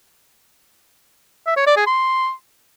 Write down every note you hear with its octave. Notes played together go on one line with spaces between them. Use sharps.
E5
C#5
D5
G#4
C6